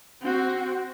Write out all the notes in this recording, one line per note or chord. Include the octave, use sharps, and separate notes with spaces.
C4 F#4